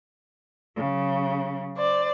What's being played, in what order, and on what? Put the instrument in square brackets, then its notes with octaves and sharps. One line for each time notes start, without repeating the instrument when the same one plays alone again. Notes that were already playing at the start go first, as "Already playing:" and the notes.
[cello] C#3 F#3
[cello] C5 [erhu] D5